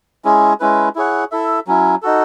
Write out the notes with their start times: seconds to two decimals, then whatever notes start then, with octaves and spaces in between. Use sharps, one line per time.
0.25 G#3 C#4 E4 G#4
0.60 G#3 C#4 E4 B4
0.95 E4 G#4 C#5 F#5
1.32 E4 A4 E5
1.67 F#3 C#4 E4
2.02 D#4 F#4 A4